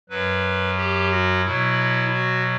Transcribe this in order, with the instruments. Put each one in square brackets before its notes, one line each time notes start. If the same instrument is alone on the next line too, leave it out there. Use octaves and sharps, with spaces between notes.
[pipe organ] F#2 F#3 B4
G4
F#4
B2 F#3 E4
F#4